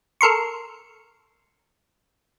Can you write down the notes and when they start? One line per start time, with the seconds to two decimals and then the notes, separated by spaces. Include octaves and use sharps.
0.21 A4 A#4 C6 C#6